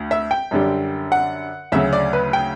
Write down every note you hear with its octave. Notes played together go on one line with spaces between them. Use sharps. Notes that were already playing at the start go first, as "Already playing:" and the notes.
Already playing: D2
E5
G5
F#2 D3 G3
F#5
D2 C#3 F#3 E5
D5
B4
G5